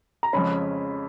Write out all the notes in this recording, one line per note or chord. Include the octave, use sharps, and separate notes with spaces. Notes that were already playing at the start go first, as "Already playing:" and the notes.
A#5
F2 C#3 G#3 C#4 B5